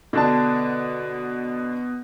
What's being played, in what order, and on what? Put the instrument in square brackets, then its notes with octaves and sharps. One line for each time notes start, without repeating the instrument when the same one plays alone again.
[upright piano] B2 [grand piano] D3 D4 A5